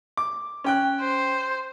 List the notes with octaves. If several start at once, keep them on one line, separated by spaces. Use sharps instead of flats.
D6
C#4 G5 F#6
C5